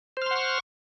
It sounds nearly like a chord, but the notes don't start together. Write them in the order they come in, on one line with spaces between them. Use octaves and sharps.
C5 F6 C6 F#5 C#6